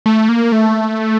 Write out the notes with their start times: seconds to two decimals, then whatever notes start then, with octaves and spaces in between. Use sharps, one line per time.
0.06 A3
0.29 A#3
0.52 A3